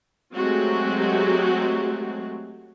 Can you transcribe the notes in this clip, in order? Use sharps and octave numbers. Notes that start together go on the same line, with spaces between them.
F#3 G#3 A3 C4 F#4 G4